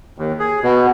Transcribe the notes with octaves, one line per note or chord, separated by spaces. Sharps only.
D#2
G#4
B2